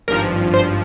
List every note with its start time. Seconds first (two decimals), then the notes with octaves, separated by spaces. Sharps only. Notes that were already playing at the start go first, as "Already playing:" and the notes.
0.08 G#1 G2 F3 A#4
0.54 C5